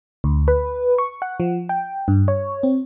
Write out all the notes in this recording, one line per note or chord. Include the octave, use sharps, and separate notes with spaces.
D2
B4
C#6
F#5
F3
G5
G2
C#5
C4